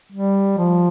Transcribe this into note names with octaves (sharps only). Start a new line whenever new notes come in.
G3
F3